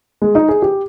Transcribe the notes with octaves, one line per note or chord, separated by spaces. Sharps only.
G#3
D#4
G#4
G4